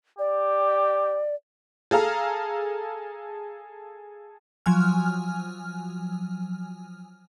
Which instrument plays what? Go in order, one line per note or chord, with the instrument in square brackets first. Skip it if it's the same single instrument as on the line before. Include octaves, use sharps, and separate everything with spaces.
[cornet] G4 [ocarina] D5
[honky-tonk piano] G#4 A4 F5 A#5
[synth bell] F3 F#3 G#5 F6